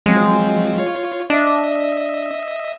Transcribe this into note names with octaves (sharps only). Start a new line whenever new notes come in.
F3 F#3 G#3 C4
F4 C#5
D4 D#5 E5